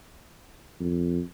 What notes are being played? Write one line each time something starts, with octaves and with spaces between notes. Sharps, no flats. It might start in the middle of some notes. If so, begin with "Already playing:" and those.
F2